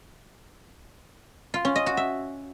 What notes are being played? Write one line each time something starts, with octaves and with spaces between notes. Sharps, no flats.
F4
C#4
D#5
F#4
E5